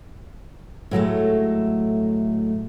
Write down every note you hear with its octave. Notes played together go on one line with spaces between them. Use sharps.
A2 F#3 G#3 A3